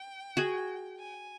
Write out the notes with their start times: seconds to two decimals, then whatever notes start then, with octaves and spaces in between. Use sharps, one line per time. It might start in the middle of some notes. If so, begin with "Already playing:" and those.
Already playing: G5
0.37 F#4 G#4
0.99 G#5